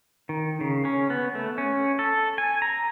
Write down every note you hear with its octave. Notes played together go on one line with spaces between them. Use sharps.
D#3
C#3
C#4
B3
A3
C#4
A4
G#5
A#5